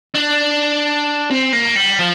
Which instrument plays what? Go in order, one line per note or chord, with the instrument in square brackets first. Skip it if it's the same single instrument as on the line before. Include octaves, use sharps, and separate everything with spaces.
[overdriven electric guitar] D4
C4
A#3
G3
F3